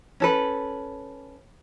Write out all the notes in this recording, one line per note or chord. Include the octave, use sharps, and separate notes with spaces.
C#4 A4 B4